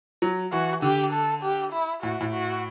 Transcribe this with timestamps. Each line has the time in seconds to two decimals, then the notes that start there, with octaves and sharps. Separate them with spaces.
0.22 F#3
0.52 E3 F#4
0.82 D3 G4
1.13 A4
1.43 G4
1.73 E4
2.03 A2 F#4
2.20 A2
2.33 F#4